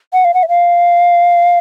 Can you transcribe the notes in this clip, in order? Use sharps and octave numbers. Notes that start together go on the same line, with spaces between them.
F#5
F5
F#5
E5
F5